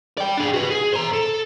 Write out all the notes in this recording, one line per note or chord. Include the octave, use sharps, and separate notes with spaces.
D5 G5
D4 G#4
F#4 B4
G#4
C5 A#5
A4